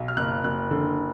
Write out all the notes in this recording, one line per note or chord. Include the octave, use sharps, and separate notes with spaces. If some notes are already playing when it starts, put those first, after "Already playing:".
Already playing: B1
F6
F#1 F#6
F#1 F#6
D3